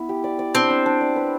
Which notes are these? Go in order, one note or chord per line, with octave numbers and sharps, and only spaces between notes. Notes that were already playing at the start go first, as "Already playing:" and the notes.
Already playing: B3 E4
G4
D5
D5
C4 D4
D4
D4
D5
B4